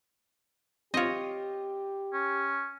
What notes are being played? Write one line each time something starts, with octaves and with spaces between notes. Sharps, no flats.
C4 F4 G4 C#5 D#5
C#4